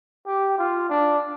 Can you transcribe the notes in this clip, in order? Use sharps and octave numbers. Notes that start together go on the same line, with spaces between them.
G4
F4
D4